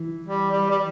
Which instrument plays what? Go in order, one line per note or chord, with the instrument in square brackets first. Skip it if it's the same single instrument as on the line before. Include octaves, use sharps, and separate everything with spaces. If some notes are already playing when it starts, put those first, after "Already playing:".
Already playing: [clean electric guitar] E3
[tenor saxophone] G3
G3
G3